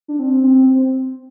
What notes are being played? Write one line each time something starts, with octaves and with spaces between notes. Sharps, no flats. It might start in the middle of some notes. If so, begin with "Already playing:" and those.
D4
C4
C4
C4